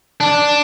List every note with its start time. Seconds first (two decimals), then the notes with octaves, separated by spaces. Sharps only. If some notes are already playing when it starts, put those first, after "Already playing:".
0.20 D4